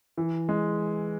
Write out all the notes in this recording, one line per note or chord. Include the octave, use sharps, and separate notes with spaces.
E3
G#3